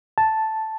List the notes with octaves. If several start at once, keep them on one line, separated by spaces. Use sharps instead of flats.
A5